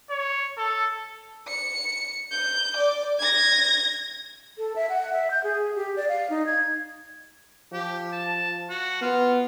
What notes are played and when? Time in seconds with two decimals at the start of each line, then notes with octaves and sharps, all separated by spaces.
0.10 C#5
0.58 A4
1.47 C#7
2.31 G6
2.76 D5
3.20 G#6 A#6
4.58 A4
4.76 E5
4.89 F#5
5.13 E5
5.31 G6
5.44 G#4
5.76 G4
5.96 D5
6.09 F5
6.30 D#4
6.47 G#6
7.73 F3 G4
8.13 A5
8.70 F#4
9.02 B3 F4